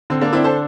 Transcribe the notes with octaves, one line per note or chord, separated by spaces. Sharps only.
D3 C4
A#3 D4
C4 D4 E4
A4 C5